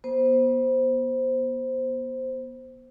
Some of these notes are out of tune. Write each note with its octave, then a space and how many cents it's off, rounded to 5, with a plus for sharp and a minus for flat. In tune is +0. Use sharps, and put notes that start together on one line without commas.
B3 -30 C5 +0